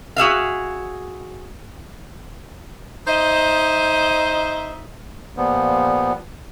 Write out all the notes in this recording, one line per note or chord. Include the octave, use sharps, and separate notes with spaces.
F#4 G#4 E5 F5
D#4 C5 D#5 E5
A#2 F3 G3 B3